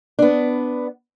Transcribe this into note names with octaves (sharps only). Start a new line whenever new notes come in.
B3 D4